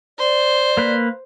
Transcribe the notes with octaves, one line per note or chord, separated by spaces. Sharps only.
C5 D5
A#3 B4